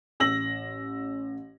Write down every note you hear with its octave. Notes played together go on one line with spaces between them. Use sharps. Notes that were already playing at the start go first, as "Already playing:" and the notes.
A1 E6 A#6 F#7